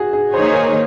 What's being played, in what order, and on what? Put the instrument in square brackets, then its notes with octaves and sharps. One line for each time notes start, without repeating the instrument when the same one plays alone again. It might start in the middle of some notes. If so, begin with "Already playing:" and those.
Already playing: [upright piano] F#4 G#4
G#4
[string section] D#3 A#3 D#4 G#4 C#5 [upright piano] C5
[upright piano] A#4